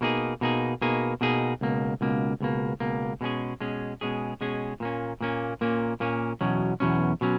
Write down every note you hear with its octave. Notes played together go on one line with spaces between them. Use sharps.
B2 A#3 D#4 G#4
B2 A#3 D#4 G#4
B2 A#3 D#4 G#4
B2 A#3 D#4 G#4
C#2 B2 A#3
C#2 B2 A#3
C#2 B2 A#3
C#2 B2 A#3
B2 G#3 C#4 G#4
B2 G#3 C#4 G#4
B2 G#3 C#4 G#4
B2 G#3 C#4 G#4
A#2 A#3 C#4
A#2 A#3 C#4
A#2 A#3 C#4
A#2 A#3 C#4
E2 B2 F#3 C#4
E2 B2 F#3 C#4
B2 F#3 C#4